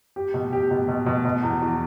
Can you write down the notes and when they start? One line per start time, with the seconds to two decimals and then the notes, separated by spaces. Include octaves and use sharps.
0.16 G4
0.34 B2
0.53 G4
0.71 B2
0.88 B2
1.06 B2
1.25 B2
1.43 E2
1.61 E2